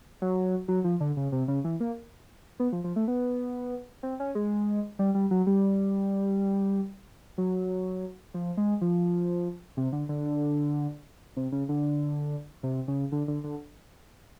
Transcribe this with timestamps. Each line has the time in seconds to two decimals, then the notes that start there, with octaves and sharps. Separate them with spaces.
0.22 F#3
0.68 F#3
0.84 F3
1.00 D3
1.17 C#3
1.32 C3
1.48 C#3
1.64 E3
1.80 A#3
2.60 B3
2.72 F3
2.84 F3
2.96 A3
3.08 B3
4.03 C4
4.20 C#4
4.35 G#3
4.99 G3
5.15 G3
5.31 F#3
5.47 G3
7.38 F#3
8.34 F3
8.57 G#3
8.81 F3
9.77 C3
9.93 D3
10.09 D3
11.37 C3
11.52 C#3
11.69 D3
12.63 C3
12.88 C#3
13.12 D3
13.28 D3
13.44 D3